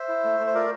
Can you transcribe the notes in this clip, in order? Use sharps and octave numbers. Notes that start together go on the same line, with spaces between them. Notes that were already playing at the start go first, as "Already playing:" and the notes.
Already playing: C5 E5
E4
A3
A3
C5
F4 A#4 D5